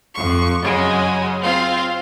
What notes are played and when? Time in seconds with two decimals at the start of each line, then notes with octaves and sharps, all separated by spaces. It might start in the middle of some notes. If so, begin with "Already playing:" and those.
0.15 F2 C#6
0.62 F#2 C#3 G#3 F#4
1.42 C4 F4 F5